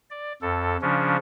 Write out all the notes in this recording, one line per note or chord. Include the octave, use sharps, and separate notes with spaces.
D5
F2 A4
C#3 F3 C#4 D4